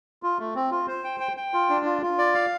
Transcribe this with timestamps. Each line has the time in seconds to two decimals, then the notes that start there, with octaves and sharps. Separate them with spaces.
0.23 F4
0.39 A3
0.55 C4
0.71 F4
0.88 C5
1.04 G5
1.20 G5
1.37 G5
1.54 F4
1.70 D4
1.86 F4
2.02 F4
2.18 D5
2.35 F5